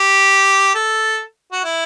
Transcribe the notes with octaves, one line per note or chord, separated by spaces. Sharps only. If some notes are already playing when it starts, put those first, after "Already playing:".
Already playing: G4
A4
F#4
E4